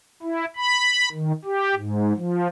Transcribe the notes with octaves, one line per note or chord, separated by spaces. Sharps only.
E4
B5
D#3
G4
G#2
F3